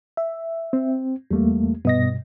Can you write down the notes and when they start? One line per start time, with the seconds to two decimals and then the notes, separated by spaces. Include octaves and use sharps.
0.17 E5
0.73 C4
1.31 E2 G3 A3 A#3
1.85 G2 B2 B3 D#5 A#6